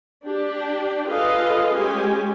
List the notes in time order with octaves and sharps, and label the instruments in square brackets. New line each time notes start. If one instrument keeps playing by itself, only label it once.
[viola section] D4 G4
F4 G#4 A4 B4 D#5 F5
G#3 C#4 G4 G#5